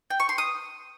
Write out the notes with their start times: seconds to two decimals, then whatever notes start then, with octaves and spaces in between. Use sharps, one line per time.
0.10 G5
0.20 C#6
0.29 C6
0.38 D#6